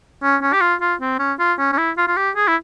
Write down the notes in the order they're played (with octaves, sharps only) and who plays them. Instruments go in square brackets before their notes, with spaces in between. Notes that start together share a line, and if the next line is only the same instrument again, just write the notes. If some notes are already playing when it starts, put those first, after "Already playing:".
[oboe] C#4
C#4
G4
F4
F4
C4
C#4
F4
C#4
C#4
E4
F4
F4
G4
G#4
E4